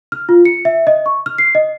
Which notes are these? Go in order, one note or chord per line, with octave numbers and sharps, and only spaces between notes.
F6
F4
C#7
E5
D#5
C#6
F6
C7
D#5